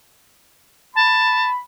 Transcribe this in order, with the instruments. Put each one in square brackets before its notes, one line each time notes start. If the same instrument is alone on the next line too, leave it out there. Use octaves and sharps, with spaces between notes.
[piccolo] A5 [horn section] B5